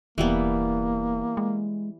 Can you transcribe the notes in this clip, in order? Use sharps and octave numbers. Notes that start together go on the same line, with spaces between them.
E1 E3 G3 A#3 B3
G#3